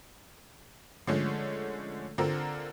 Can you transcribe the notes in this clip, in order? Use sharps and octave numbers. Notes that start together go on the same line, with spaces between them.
D3 F3 G#3 A3 C#4
D3 C4 F4 A4 A#4